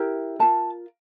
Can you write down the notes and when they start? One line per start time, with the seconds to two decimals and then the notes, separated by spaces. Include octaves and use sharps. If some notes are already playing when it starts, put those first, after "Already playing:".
Already playing: E4 G4 A#4
0.39 F4 A#4 A5